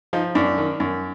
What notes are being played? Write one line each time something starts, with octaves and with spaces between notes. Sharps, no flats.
F3 D#4
F#2 D4
D#3
F#2